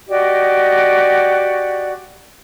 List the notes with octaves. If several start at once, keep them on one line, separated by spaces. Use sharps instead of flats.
F#4 G4 D5 D#5